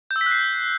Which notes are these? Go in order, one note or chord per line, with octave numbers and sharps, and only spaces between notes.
G6
E6
B6
F#6
C7